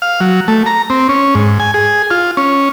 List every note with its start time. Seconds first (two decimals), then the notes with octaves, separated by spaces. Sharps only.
0.02 F5
0.20 F#3
0.48 A3
0.66 A#5
0.90 C4
1.09 C#4
1.35 G#2
1.60 G#5
1.74 G#4
2.11 F4
2.37 C#4